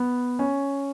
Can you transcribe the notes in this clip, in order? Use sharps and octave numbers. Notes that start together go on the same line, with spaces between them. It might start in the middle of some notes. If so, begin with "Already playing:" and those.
Already playing: B3
C#4